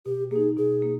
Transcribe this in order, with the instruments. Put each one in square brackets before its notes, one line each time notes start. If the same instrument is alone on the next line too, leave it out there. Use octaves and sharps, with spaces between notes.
[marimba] B2 [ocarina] G4
[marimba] A#3 D#4 [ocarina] G#4
[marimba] B2 [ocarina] G#4
[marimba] A#3